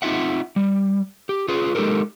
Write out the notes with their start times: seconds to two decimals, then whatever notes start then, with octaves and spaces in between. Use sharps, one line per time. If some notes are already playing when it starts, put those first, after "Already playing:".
0.02 C4 D#4 F4 E5 F#5
0.56 G3
1.29 G4
1.48 F4 G#4 B4
1.75 G#3 D#4 G4 A4 A#4